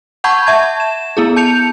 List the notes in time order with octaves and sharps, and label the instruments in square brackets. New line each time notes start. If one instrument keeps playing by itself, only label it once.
[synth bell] F#5 A5 B5 C#6 G6 G#6
E5 A5 G#6
E7
B3 E4 G#4
A5 G6 C#7 F7